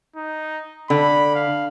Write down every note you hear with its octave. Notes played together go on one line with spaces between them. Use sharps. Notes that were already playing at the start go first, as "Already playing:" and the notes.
D#4
D3 B5
F5